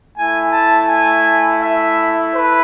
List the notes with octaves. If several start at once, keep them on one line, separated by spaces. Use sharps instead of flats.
A3 E4 G#5
A5
G#5
E5
B4